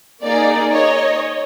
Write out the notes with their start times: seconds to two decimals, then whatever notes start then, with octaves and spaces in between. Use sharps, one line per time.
0.23 A#3 D#4 G#4 D5
0.73 C#5 D#5